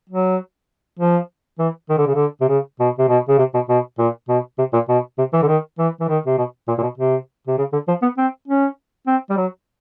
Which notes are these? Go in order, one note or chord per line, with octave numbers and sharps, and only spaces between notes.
F#3
F3
E3
D#3
D3
C#3
D3
C3
C#3
B2
C3
B2
C#3
C3
B2
B2
A#2
B2
C3
A#2
B2
C3
E3
D3
D#3
E3
E3
D#3
C3
B2
A#2
A#2
B2
C3
C3
C#3
D3
F3
B3
C4
C#4
C4
G3
F#3